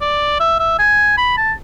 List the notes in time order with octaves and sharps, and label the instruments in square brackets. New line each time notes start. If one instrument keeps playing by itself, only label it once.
[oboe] D5
E5
E5
G#5
B5
A5